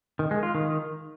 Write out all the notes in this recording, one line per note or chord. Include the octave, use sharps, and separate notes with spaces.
D#3
G#3
F4
D#3